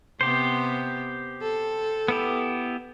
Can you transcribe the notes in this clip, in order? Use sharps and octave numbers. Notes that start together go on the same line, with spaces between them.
C3 B3 G4 C5
A4
B3 E4 G4